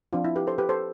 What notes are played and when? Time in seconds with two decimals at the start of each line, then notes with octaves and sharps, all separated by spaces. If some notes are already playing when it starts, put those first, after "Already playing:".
0.13 F3 C4 D4 F4
0.24 E4
0.36 G4 B4
0.47 A4 C5
0.58 G4 B4
0.69 A4 C5